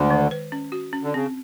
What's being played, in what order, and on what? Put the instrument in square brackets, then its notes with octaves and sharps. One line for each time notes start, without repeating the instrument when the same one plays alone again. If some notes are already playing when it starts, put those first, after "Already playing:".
Already playing: [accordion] D2 D3 [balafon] G#3
[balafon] D#3
B4
C#4
F#4
C#4
[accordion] D3
[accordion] C#3 [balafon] C4